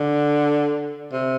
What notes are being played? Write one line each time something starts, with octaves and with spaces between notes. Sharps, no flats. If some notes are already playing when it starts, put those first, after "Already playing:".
Already playing: D3
C3